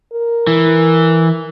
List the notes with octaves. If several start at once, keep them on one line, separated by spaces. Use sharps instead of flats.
A#4
E3